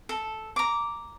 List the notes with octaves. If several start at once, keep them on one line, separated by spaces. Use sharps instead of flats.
A4
A#5 D6